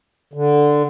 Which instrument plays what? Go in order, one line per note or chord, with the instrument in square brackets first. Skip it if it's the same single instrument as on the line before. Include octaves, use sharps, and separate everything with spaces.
[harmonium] D3